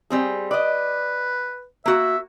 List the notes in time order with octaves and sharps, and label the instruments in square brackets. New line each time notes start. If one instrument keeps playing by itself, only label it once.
[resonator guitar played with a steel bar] G3 C4 G#4
[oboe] B4 [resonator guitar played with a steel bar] D5 D#5
[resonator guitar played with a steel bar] A#3 F#4 [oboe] E5